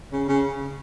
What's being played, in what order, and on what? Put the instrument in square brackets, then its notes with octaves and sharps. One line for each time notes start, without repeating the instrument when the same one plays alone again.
[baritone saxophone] C#3
C#3